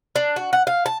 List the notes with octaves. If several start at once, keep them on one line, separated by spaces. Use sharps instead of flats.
D4
F#4
F#5
F5
A5